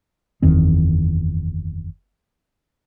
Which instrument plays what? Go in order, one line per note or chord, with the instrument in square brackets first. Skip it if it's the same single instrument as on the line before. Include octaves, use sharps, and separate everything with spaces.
[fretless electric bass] F#1 E2 D#3 C4